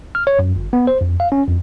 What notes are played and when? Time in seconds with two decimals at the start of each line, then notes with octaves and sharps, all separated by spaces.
0.15 F6
0.27 C#5
0.39 F#2
0.56 G1
0.73 B3
0.87 C5
1.01 F2
1.20 F5
1.32 C#4
1.48 F2